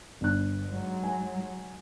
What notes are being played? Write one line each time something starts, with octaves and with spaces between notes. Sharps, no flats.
G1 F#6
G#2 F#3
G#5